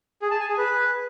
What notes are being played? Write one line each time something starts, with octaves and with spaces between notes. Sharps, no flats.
G#4
A5
G#5
G#4
B4